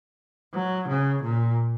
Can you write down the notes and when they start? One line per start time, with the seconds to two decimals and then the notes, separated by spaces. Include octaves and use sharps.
0.54 F#3
0.88 C#3
1.24 A#2